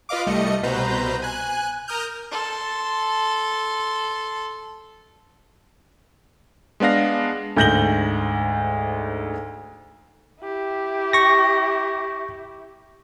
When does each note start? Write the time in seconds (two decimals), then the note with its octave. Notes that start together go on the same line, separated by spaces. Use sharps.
0.09 F4 B4 D#5 F5 D6
0.26 C2 G3 A3 D#5 C#7
0.63 C2 B2 B4 C5 A#5 G6
1.22 G#5 F#6
1.88 A#4 D#6 F6 G6
2.31 A4 C6
6.80 G#3 B3 D4 F5 A#6
7.57 D2 G#2 G6 A#6 F#7 G7
10.42 E4 G4
11.13 C#6 A#6